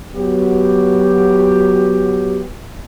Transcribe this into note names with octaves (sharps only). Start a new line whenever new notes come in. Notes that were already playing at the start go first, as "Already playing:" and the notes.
F#3 B3 F#4 G4